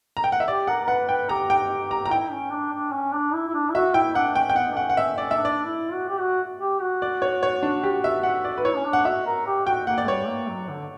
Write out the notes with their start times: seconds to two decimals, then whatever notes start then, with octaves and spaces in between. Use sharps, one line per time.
0.17 A#5
0.24 G5
0.32 F#5
0.40 E5
0.48 G4 D5
0.67 A#4 F#5
0.84 A#4
0.88 B4 F#5
1.09 B4 G5
1.29 G4 A#5
1.50 G5
1.91 A#5
2.06 A#5
2.11 E4 G5
2.32 C#4
2.52 D4
2.73 D4
2.93 C#4
3.13 D4
3.34 E4
3.48 E4
3.54 D4
3.69 E4
3.74 F#4 E5
3.94 E4 G5
4.15 D4 F#5
4.36 C#4 G5
4.50 G5
4.56 B3 F#5
4.70 D4
4.77 C#4 F#5
4.90 F#5
4.97 C#4 E5
5.17 C#4 D5
5.31 E5
5.37 D4
5.45 D5
5.65 E4
5.93 F#4
6.09 G4
6.19 F#4
6.61 G4
6.81 F#4
7.02 D5
7.22 C#5
7.43 C#5
7.63 D4
7.84 G4
8.04 E5
8.23 F#5
8.45 D5
8.58 B4
8.65 E4 C#5
8.76 C#4
8.86 D4
8.93 F#5
9.05 F#4 E5
9.26 A#4
9.46 G4
9.67 F#4 G5
9.87 A#3 F#5
9.98 D5
10.07 G3 C#5
10.28 A#3
10.49 F#3
10.69 D3